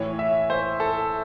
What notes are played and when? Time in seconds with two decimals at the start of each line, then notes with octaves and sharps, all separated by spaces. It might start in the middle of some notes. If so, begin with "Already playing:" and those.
Already playing: A2 E3 C#5
0.19 E5
0.50 C5
0.80 A4